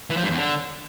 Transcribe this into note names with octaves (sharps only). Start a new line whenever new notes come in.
E3
F3
G2
E2
D3